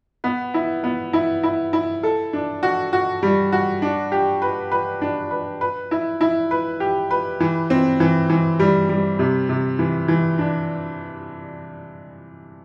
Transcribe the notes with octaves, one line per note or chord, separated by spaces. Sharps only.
B3
E4
B3
E4
E4
E4
A4
D4
F#4
F#4
G3
F#4
D4
G4
B4
B4
D4
B4
B4
E4
E4
B4
G4
B4
E3
C4
E3
E3
G3
G3
C3
C3
E3
E3
D4